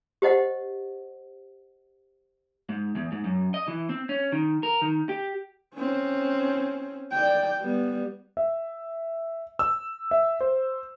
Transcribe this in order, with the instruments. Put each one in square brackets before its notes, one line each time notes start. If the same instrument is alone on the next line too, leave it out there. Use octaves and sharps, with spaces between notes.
[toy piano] G4 C5 D#5 F#5
[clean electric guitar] G#2
E2
G#2
F#2
D#5
E3
C4
C#4
D#3
A#4
D#3
G4
[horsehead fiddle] C4 C#4
D5 G5
G3 B3
[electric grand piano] E5
E6
E5
C5